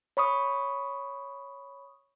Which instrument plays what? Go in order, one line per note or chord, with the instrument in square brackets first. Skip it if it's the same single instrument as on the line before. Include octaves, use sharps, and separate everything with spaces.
[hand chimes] C#5 B5 C#6 D#6